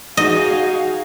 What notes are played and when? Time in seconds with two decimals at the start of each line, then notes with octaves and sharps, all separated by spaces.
0.17 D#4 F#4 G#4 D#5 F5